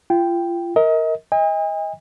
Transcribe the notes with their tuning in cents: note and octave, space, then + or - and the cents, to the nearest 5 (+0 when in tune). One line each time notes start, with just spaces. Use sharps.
F4 -30 G5 +0
A#4 -5 D#5 +35
D#5 +30 G#5 -45